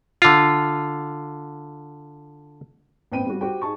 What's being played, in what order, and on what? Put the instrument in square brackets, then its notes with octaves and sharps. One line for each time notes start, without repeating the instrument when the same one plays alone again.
[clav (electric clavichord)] D3 F4
[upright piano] A1 B3 C4 G5 D#7
G3 F#4
F#4 G4 C5 G5
D#4 G#4 A5 C#6